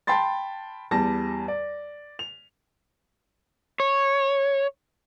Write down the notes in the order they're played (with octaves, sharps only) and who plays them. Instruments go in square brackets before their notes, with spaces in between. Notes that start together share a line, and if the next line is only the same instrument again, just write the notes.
[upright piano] G5 A5 B5 C6 A6
E2 G3 A5 A#6
D5
F7
[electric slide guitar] C#5